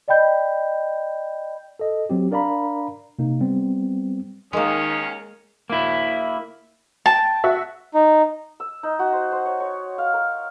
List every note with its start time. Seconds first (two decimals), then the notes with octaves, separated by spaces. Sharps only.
0.08 D5 D#5 G5 B5 G6
1.79 A4 D#5
2.10 F#3 C4 G4
2.31 D4 A#4 D5 F5 A#5 B5
3.19 C3 A#3 D#4
3.41 G3 B3 C4
4.53 D#2 D#3 G#3 A#3 C#4 A#4 D#6
5.70 A#3 E4
7.06 G5 A5
7.44 F#4 E5
7.94 D#4
8.60 E6
8.83 D#4
8.99 F#4
9.12 C5
9.32 C5
9.45 C#5
9.60 C#5
9.98 F5
10.14 A#4